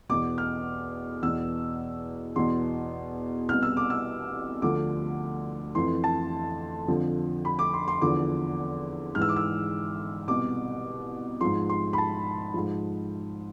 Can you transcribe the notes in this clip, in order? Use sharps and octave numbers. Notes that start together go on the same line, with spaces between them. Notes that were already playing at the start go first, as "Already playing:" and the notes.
E2 B2 D6
F6
E2 B2 E6
E2 B2 C6
C2 B2 F6
E6
D6
E6
D2 D3 F3 D6
F2 E3 C6
A5
F2 D3 F3
B5
D6
C6
C6
E2 D3 F3 D6
G#2 E3 E6 F6
D6
E6
C2 B2 D6
G#2 F3 C6
C6
B5
A5
G#2 F3